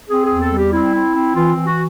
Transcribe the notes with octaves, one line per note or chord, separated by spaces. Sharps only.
C4 G#4
E2 G#4
A4
G3
G4
C4 E4
C4
C4
E3 F4
E3
F#4